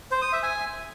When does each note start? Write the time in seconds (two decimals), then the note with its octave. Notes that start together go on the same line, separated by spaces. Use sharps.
0.11 C5
0.22 D#6
0.32 E5
0.43 G#5